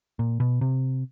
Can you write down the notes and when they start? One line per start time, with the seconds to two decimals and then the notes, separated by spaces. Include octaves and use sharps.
0.19 A#2
0.40 B2
0.61 C3